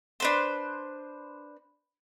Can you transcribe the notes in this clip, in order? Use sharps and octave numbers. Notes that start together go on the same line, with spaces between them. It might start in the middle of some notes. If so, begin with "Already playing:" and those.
D4 B4 C5